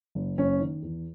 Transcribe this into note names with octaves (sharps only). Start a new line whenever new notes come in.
F#1
F#1 C#4
D#3
E2